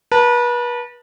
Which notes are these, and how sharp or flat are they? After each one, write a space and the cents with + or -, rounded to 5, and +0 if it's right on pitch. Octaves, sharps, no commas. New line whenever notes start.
B4 -35 A5 +15